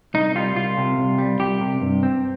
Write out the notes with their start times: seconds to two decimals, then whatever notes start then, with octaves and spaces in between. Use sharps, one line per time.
0.14 C2 D#4
0.36 G3 F4
0.56 C2 F4
0.77 C3
0.98 C2
1.18 G3
1.40 C2 G4
1.61 C3
1.81 G2
2.03 C4